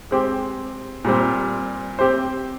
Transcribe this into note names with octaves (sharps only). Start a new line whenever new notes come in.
G#3 C4 G4
A#2 G3 C4
C4 G4 C5